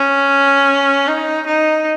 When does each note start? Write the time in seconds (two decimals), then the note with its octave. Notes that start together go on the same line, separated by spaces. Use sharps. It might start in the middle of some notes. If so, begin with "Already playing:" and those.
Already playing: C#4
1.08 D#4
1.47 D#4